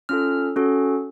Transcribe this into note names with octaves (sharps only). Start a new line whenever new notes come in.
C#4 F4 A4 F6
C#4 F#4 A4